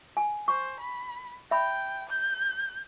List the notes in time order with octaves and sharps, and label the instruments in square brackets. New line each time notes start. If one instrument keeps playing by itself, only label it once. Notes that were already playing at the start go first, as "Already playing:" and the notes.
[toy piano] G#5
[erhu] C5 [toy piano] C#6
[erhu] B5
[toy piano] E5 B5 [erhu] G5
[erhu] G6